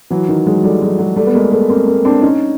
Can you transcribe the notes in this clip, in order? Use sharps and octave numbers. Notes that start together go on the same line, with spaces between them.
E3 F#3
D#3
F#3 G#3
G3 A3
F#3 G#3
F#3 G#3
G3 A3
B3
G#3 A#3
A3 B3
A#3 C4
A#3 C4
C4 D4
C#4 D#4